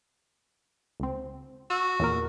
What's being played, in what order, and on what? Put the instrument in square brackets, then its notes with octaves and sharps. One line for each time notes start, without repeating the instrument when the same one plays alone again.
[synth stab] C#2 C4
[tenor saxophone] F#4 [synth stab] E6
[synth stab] E2 A#2 A#4